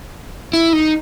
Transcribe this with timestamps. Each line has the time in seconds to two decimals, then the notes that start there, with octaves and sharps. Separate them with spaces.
0.53 E4
0.73 D#4